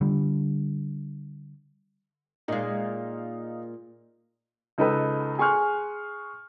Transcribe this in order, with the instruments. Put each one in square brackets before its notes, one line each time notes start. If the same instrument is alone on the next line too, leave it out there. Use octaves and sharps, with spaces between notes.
[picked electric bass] D3 G3
[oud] A#2 G#3 [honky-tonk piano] D#4 F5
[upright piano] C#2 D#4 A4 B4
G#4 G#5 C6 C#6 F6 F#6